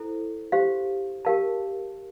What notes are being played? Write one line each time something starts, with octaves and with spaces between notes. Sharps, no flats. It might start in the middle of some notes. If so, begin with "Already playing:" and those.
Already playing: E4 A4 C5
G4 C5 F5 C6
G4 A#4 F5 A5